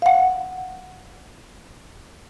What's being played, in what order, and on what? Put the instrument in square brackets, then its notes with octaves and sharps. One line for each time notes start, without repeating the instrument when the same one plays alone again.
[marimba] F5 F#5